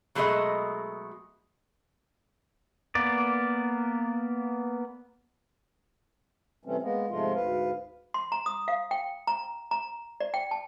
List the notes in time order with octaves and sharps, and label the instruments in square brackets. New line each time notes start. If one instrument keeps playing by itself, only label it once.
[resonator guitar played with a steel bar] B2 F#3 G#3 A3 G#4 D#5
[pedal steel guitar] A#3 B3 D5
[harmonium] C3 E3 G3 A3 C4 C#4
G#3 A#3 B3
G#2 C3 F3 G#3 A3 F4
D2 G#2 B4 F5
[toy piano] C6
A#5
D#6
F5
G5
A#5
A#5
D5
G5
A5